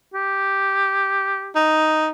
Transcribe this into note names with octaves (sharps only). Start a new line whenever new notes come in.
G4
D#4